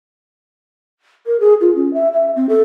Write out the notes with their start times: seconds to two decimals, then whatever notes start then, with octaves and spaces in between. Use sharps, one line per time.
1.26 A#4
1.40 G#4
1.61 F4
1.75 C#4
1.94 E5
2.13 E5
2.36 C4
2.49 A4